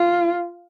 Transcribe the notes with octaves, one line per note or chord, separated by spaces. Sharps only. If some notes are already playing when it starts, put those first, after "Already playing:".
Already playing: F4